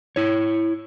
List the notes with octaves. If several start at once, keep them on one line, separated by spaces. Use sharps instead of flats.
E4 C#5